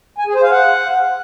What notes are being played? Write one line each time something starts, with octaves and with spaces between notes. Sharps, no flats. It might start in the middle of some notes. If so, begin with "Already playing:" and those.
G#5
G#4
C5
F5
F#5